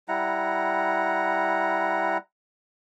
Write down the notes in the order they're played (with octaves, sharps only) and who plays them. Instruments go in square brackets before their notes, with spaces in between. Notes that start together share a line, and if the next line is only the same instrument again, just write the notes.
[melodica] G3 E4 F#5 A#5